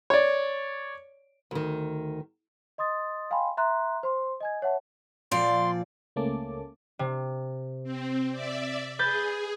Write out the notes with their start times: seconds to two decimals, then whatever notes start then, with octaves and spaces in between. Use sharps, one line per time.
0.10 C#5 D5
1.51 D2 D#3
2.78 D#5 C6 D#6 A6
3.30 D#5 F5 G5 G#5 B5 C6
3.57 E5 A#5 C6 F#6
4.03 C5 C6
4.41 D#5 G#5 G#6
4.62 C#5 E5 F#5 A5
5.31 A#2 F3 D5 C6
6.16 C#2 A3 A#3 C#4 A5 D6
6.99 C3
7.84 C4
8.32 D5 E5
8.99 G#4 B4 G6 A6